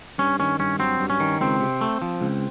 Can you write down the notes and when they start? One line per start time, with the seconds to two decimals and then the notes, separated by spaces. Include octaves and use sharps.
0.18 G2 C#4
0.39 D#3 C#4
0.59 G2 C#4
0.79 F#3 C4
1.00 G2
1.10 C#4
1.20 D#3
1.41 C#2 C4
1.61 C3
1.81 A3
2.02 F3
2.21 C#2